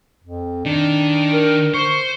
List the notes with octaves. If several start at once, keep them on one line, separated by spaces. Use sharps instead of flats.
F2
D#3 D4
A#4
C5 C#6